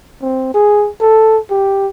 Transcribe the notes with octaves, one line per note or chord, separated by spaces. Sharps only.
C4
G#4
A4
G4